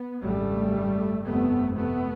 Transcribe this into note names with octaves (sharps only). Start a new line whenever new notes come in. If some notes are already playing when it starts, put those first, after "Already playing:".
Already playing: B3
G#1 F#2 C#3 G3 A3
G1 F2 C3 A3 B3
A3 B3